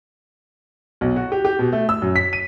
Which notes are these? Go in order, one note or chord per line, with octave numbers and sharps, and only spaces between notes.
B1
F#4
G4
G4
B2
A3
E6
F#2
B6
D#7